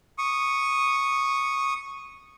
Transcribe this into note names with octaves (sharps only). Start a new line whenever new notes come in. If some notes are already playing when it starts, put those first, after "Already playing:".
C#6 D#6